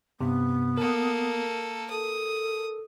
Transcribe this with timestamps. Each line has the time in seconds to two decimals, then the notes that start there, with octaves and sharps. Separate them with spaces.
0.21 G2 C3 B3
0.77 A#3 A4 A#4
1.90 A4 D#6